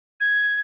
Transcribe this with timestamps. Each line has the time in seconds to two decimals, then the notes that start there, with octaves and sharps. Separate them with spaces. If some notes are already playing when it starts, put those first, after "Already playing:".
0.21 G#6